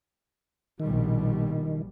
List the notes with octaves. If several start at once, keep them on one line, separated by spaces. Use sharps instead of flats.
A#1 B2 D#3 G3